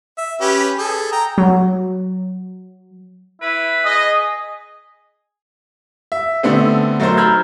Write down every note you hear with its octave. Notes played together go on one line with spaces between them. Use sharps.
E5
C#4 G4 B4
G#4 A4
G5 A#5
F#3
E4 B4
G#4 D#5
E5
D3 A3 B3 C4
F#3 A3 D#4 A#4 C5
A#5 B5 E6 F6 G6 G#6